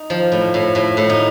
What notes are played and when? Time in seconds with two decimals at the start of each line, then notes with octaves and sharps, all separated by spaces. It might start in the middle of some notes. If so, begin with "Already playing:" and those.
Already playing: D#4
0.10 F3
0.32 A2
0.54 A2
0.75 A2
0.97 A2
1.10 D#4